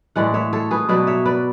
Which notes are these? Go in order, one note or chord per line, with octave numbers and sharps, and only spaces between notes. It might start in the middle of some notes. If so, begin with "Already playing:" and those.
A2 E3 G#3 D5 F#5
C#5 E5
A4 C#5
G#4 B4
B2 F#3 B3 B4 D5
C#5 E5
B4 D5